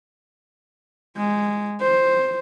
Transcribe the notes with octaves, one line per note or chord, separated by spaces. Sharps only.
G#3
C5